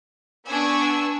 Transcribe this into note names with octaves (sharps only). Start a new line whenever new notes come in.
B3 D4 G#5 C#6 E6